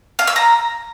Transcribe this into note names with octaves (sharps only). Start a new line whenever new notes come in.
F5
E6
A#5